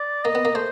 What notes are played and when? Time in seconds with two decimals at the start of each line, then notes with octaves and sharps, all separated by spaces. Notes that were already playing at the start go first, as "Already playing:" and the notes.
Already playing: D5
0.24 A#3 D#5
0.35 B3
0.45 A#3
0.55 A3 C5